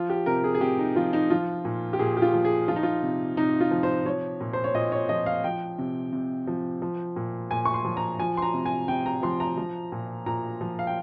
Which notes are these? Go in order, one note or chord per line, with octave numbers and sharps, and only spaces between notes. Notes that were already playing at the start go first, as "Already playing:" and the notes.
Already playing: F3 F4
G4
C3 A#4
G#4
G#4
C3 G4
D#4
F3 F4
D#4
F3 F4
A#2
G4
A#2 G#4
G4
F4
F3
G#4
F3 F4
D#4
F4
C3
C3 D#4
F4
F3
C5
F3 C#5
A#2
C5
C#5
A#2 D#5
C#5
F3 D#5
F5
F3 G5
C3
C3
F3
F3
A#2
A#2 G#5
C#6
C6
F3
A#5
F3 G#5
C6
A#5
C3
G#5
C3 G5
A#5
F3 C6
A#5
F3
A#2
A#2 A#5
F3
F5
G5